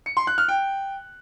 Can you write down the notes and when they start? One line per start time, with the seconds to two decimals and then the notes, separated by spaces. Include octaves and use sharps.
0.06 C#7
0.17 C6
0.27 F#6
0.38 F6
0.48 G5